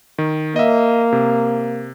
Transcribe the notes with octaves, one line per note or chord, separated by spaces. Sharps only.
D#3
A#3 D#5 E5
C3